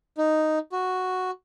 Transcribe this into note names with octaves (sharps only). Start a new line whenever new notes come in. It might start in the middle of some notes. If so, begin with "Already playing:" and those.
D#4
F#4